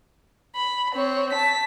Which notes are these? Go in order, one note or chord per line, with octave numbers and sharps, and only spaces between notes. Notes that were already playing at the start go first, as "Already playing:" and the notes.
B5
C4 C#5
A5 B6